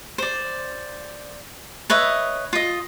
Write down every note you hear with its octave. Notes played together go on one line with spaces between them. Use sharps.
C5 D5
B4 C#5 D#5 E5
F4 D#5